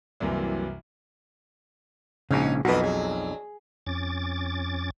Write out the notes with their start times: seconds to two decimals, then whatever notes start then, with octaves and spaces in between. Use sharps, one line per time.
0.20 C2 F#2 C3 E3 F#3 A#3
2.31 A#1 G#2 C#3 C#4 D#4 F#4
2.65 B1 F2 A#3 D4 F#4 B4 D#5
2.84 G2 F#3 G#4
3.87 F2 C#4 D6 A6